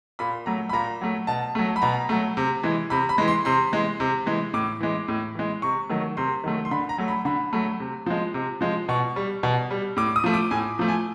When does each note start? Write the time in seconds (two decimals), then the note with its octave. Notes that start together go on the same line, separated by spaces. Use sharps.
0.19 A#2 B5
0.46 F#3 A3 A#5
0.69 B5
0.73 A#2 A#5
1.01 F#3 A3
1.27 B2 A5
1.55 F#3 A3
1.76 B5
1.82 B2 A#5
2.09 F#3 A3
2.37 C3
2.63 E3 G#3
2.90 C3 B5
3.09 B5
3.18 E3 G#3
3.28 C6
3.45 C3 C6
3.72 E3 G#3
4.00 C3
4.26 E3 G#3
4.54 A2 D6
4.80 E3 G#3
5.08 A2
5.35 E3 G#3
5.62 C3 C#6
5.89 D#3 F#3 A3
6.17 C3 C6
6.44 D#3 F#3 A3
6.65 C6
6.71 D3 B5
6.89 A#5
6.98 F#3 A3
7.08 B5
7.25 D3 B5
7.53 F#3 A3
7.80 C3
8.06 F3 G#3
8.34 C3
8.61 F3 G#3
8.89 B2 C#6
9.16 G3
9.43 B2
9.71 G3
9.97 A2 D6
10.16 D#6
10.24 F3 A3
10.34 D6
10.51 A2 G#5
10.79 F3 A3
10.88 G#5